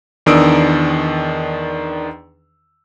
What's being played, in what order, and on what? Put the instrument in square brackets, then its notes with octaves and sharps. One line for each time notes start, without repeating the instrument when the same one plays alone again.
[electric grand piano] E2 D#3 D4 D#6 E6 D7